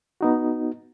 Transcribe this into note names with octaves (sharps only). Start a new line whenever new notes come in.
B3 D#4 F#4